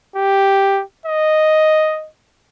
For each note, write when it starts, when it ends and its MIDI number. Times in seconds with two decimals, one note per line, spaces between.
0.16 0.82 67
1.06 2.08 75